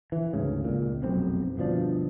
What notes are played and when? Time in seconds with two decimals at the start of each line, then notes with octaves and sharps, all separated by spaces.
0.12 E3
0.33 D2 G#2 C#3
0.65 C#2 A#2
1.02 F1 B1 F#2 C4
1.58 G1 B2 F3 D4